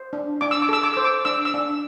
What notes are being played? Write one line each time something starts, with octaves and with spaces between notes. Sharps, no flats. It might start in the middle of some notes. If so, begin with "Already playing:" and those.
Already playing: C5
D4
D4 D6
E6
D6
A4 E6
D6
C5 E6
D6
D4 E6
E6
D4